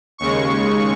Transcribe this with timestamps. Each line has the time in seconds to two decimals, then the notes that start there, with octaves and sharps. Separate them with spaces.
0.18 D#2 C#3 G#3 C#6